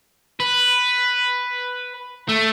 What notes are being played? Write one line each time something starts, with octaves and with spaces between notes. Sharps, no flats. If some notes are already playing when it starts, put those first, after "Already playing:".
B4
A3